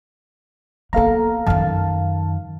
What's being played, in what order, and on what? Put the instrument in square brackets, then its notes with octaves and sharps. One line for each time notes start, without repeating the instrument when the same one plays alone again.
[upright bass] A#3 B3 [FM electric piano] A4 F5 A#5
[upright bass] F#2 D#3 [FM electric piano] F5 A5